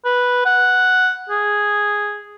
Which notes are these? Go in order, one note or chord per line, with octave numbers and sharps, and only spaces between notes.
B4
F#5
G#4